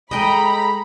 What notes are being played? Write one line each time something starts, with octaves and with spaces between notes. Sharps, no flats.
G#3 G#4 A4 D#5 G5 A#5 B5